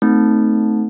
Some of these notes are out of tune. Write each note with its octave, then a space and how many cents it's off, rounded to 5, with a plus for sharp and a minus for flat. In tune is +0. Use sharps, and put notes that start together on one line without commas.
A3 +0 C4 -30 D#4 +0